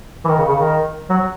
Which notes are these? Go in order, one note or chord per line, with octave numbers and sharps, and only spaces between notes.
E3
D#3
C#3
C#3
D#3
F#3